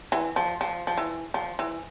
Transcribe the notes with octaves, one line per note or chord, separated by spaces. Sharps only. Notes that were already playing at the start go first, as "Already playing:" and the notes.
E3
F3
F3
F3
E3
F3
E3